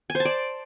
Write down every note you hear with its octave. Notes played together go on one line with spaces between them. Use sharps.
G#5
C5
A5
D5